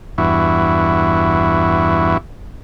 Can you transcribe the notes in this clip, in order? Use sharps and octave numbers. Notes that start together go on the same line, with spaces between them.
E2 G2 E4 F#4